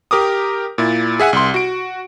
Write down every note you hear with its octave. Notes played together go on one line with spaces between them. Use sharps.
G4 A#4 D6 D#6
A#2 E4
G#4 E5 F#5 G#5
C2 C6
F#4 D7